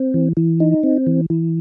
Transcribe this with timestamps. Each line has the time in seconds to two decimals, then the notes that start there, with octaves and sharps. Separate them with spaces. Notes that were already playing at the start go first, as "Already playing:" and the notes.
Already playing: C4
0.14 E3
0.37 E3
0.60 D#4
0.83 C4
1.07 E3
1.30 E3